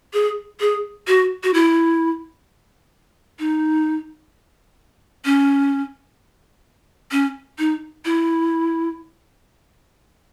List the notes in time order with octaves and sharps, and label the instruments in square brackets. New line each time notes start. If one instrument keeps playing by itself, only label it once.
[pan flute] G#4
G#4
F#4
F#4
E4
D#4
C#4
C#4
D#4
E4